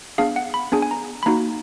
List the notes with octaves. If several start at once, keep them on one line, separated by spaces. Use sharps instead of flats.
B3 D4 G#4 F5
F#5
B5
B3 D4 G#4 G#5
G#5
A#5
B5
A#3 D#4 F#4 A#5